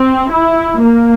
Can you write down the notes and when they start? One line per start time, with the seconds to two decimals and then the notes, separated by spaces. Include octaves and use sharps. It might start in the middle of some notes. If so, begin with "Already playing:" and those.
Already playing: C4
0.30 E4
0.82 A#3